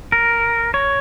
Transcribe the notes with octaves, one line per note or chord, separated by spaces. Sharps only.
A#4
C#5